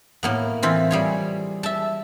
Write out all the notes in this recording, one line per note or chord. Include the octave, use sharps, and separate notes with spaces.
A2 A#3 B3
E3 C4 F4
G3 G#4 C#5
E5 A5